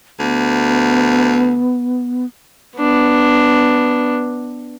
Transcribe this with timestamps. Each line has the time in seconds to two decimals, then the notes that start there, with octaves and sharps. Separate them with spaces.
0.20 D2 B3
2.77 B3 D4